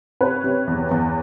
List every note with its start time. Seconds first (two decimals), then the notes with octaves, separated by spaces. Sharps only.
0.21 C3 B4 C#5
0.44 C3
0.67 E2
0.91 E2